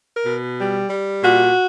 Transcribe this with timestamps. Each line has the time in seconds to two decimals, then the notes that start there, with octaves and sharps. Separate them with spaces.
0.15 A#4
0.25 B2
0.58 G3
0.90 G3
1.23 A#2 F#4